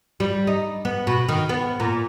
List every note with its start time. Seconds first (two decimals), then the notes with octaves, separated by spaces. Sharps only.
0.20 G3
0.47 D#4
0.85 B3
1.07 B2
1.29 D#3
1.49 B3
1.80 A#2